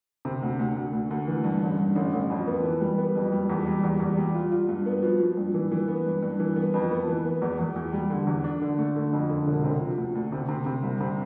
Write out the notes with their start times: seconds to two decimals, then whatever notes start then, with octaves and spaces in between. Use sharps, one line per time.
0.25 C3
0.43 D2
0.59 D2
0.76 D2
0.93 D2
1.11 D2
1.28 E3
1.44 G2
1.61 A1
1.79 G2
1.96 A1
2.13 A1
2.30 F2
2.47 B3
2.64 E3
2.81 G3
2.98 B3
3.15 F2
3.32 G3
3.49 E2
3.67 G3
3.84 E2
4.00 E2
4.17 G3
4.34 F4
4.52 F4
4.69 G2
4.86 B3
5.03 F3
5.20 F3
5.37 G2
5.54 E3
5.72 E3
5.88 B3
6.06 G2
6.23 G2
6.39 E3
6.56 B3
6.74 F2
6.91 B3
7.08 E3
7.25 B3
7.42 E2
7.59 E2
7.76 E2
7.93 G3
8.10 D3
8.27 E2
8.44 D4
8.62 D3
8.78 A3
8.96 D3
9.13 F2
9.30 D3
9.46 E1
9.64 C3
9.81 F3
9.98 D2
10.15 D2
10.32 C3
10.49 C3
10.66 C3
10.83 C2
11.00 C3